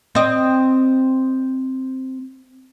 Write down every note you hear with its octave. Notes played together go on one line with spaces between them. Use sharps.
C4 D#5